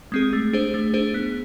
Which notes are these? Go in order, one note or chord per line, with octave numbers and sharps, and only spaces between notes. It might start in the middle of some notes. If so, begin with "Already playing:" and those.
G#3 C4 G#4
A3
D4 G#4 C5
A3
D4 G#4 C5
B3